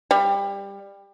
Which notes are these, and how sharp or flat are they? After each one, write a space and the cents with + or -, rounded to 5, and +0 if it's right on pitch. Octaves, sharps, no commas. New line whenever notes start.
G3 +20